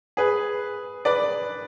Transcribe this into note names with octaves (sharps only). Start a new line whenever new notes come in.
G#4 B4
B4 D5